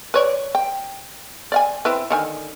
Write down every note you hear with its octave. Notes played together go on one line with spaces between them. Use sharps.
B4 C#5 D5
G5
D5 F5 G#5
C4 E4 B4
D3 D#3 G#5